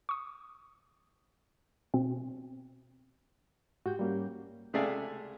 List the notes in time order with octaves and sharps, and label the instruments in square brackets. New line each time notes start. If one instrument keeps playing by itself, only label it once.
[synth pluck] C#6 D#6
B2 C4
[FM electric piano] G#2 G4 G6 [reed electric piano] F#4
[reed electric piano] G3 A#3 C#4
[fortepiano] C#2 C3 A3 G#4 D5 F5